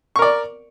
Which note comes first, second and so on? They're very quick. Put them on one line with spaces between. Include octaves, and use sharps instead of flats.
C#6 A#4 D5